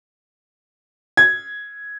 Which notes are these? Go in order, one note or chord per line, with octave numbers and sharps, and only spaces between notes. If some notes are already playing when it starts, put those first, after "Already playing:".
G#6